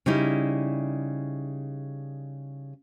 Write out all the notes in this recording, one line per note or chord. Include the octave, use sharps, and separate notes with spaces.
C#3 G3 D#4 E4